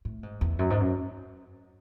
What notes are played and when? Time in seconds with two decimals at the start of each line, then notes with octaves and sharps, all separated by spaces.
0.05 A2
0.23 G#2
0.41 E2
0.59 F#2
0.70 G#2
0.80 F#2